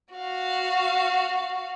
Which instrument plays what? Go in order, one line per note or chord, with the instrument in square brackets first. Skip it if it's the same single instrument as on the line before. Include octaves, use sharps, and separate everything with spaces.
[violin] F#4 F5